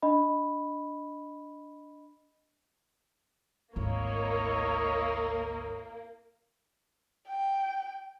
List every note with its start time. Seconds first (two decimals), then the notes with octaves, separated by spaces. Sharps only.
0.03 D4 D#5 B5
3.76 G#1 D2 A#3 E4 C#5 D#5
7.29 G5